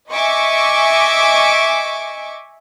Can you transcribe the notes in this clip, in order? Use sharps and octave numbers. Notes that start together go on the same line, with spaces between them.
D#5 E5 G#5 C#6 D6